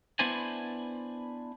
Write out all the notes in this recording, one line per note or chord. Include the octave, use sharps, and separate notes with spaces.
B3 D4 E4 C5 D5 G#5